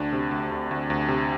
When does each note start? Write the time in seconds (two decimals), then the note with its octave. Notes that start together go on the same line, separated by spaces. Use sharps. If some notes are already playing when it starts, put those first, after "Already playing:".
Already playing: D2 D4
0.13 C3
0.31 D2
0.51 D2
0.71 D2
0.90 D2
1.08 C3